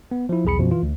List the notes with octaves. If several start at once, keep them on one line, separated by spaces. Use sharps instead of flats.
B3
F3 E4
B1 E2 G#4 B5 C#7
F#2 B2 F3
E3 F4
D2